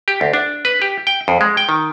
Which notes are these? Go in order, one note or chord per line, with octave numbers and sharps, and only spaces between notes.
G4
D2
D4
B4
G4
G5
F2
G#3
G5
D#3